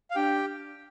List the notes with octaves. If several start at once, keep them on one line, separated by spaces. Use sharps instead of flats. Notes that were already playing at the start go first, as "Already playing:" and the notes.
F5
D4 G4 G5